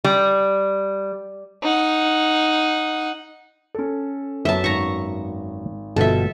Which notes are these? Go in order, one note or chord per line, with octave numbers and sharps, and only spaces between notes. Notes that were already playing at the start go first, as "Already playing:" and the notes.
G3
D#4 F#5
C#4 A4
F#2 F#3 B3 E5 A5
G#1 A#5 C#6
G1 B2 F3 A4 E5